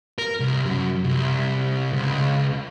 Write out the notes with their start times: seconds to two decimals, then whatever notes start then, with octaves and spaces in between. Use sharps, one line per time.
0.19 A#4
0.40 C2
0.65 F#2
1.04 C2
1.93 C#2